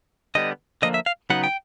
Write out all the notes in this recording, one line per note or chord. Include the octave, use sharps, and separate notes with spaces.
D3 G3 B3 D#5
D3 F3 A#3 D#5
E5
F5
C#3 F#3 B3 D#4 F#5
G5